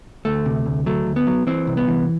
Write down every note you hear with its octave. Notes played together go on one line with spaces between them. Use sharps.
D2 A3
C3
D2
F#3 A3
D2
B3
F#3
E3 C4
C2
B3
E3